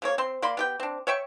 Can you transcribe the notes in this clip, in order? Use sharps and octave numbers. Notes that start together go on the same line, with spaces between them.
C#3 A#3 C#5
C4 C6
A#3 D5 B5 C6
B3 G4 G5
C4 D4
C#5 E5 G5 C#6